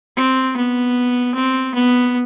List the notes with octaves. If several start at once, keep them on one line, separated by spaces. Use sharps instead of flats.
C4
B3
C4
B3